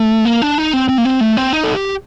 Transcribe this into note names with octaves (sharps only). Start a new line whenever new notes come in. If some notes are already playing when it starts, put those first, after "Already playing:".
Already playing: A3
A#3
D4
D#4
C4
C4
A#3
C4
A3
C4
D#4
A4
G4